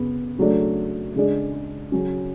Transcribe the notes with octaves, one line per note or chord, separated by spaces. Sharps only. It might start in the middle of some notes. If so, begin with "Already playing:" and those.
Already playing: F#2 C#3 B3
C#3 F#3 A3 D4
C#3 G#3 D4
C#3 F#3 C#4